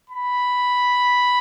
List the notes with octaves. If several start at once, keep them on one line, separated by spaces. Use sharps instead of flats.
B5